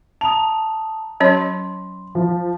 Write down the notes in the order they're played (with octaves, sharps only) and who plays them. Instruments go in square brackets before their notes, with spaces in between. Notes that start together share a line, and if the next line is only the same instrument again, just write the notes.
[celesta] A5 A#5 D#6 [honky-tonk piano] F7
[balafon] F#3 C#4 C#5 [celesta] B5 C6
[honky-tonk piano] F3